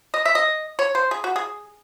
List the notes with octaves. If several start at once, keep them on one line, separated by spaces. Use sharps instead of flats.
D#5
E5
D#5
C#5
C5
G#4
F#4
G#4